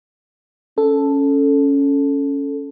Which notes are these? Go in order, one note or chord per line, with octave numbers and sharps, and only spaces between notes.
C#4 A4